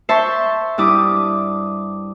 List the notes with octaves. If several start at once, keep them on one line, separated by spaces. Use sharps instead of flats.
C5 E5 A5 C6 C#6
G2 E4 D6 D#6